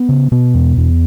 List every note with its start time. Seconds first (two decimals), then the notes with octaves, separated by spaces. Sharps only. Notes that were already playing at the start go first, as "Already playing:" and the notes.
Already playing: B3
0.09 C#3
0.32 B2 B3
0.54 E2
0.77 E2